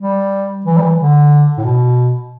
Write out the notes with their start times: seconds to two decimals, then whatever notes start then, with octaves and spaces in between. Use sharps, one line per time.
0.01 G3
0.66 E3
0.78 G3
0.82 E3
0.99 D3
1.58 A2
1.64 B2